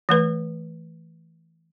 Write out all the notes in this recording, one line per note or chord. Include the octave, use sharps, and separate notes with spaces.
E3 A3 B4